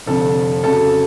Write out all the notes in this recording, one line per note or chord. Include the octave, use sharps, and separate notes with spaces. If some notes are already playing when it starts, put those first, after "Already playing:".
F1 F2 D3 A4
F2 C#3 F#3 A4